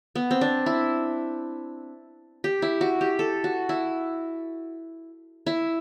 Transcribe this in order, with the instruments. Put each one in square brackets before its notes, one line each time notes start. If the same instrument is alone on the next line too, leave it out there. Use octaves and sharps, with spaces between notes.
[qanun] B3
C4
D4
E4
G4
E4
F#4
G4
A4
F#4
E4
E4